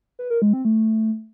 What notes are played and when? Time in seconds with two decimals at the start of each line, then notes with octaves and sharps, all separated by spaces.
0.19 B4
0.30 A#4
0.42 G#3
0.53 C4
0.65 A3